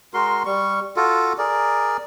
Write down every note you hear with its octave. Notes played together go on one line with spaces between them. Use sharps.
G#3 F#4 A#4 C6
G3 C#6
F4 F#4 A4
G#4 A#4 D5